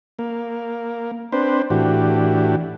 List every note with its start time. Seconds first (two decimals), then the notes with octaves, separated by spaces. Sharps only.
0.19 A#3
1.32 C4 D4 B4 C5
1.70 A2 E3 D4 F#4 G4